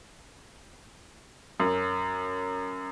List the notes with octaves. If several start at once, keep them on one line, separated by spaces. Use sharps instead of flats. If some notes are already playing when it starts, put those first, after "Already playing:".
F#2